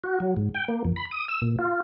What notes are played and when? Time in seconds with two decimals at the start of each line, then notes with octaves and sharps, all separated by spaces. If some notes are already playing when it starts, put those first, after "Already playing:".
0.04 F#4
0.20 F#3
0.37 G#2
0.54 G5
0.68 A#3
0.84 F2
0.96 B5
1.11 D#6
1.28 E6
1.42 A#2
1.59 F4